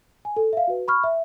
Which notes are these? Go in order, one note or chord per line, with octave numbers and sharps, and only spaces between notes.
G#5
A4
E5 F5
F#4 B4
B5 C#6 F6
E5